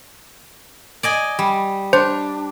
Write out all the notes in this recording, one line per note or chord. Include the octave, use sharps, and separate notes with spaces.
D5 D#5 G#5
G3
D4 C5